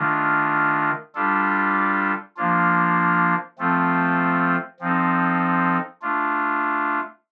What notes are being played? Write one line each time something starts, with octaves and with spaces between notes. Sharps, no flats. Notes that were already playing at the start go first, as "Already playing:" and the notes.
Already playing: D#3 A3 D4 F4
G3 D4 F4 A4
F3 A#3 D4 F4
F3 A3 C4 F4 A4
F3 C4 D#4 A4
A3 D4 F4